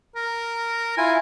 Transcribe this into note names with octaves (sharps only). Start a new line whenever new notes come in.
A#4
E4 F4 G#5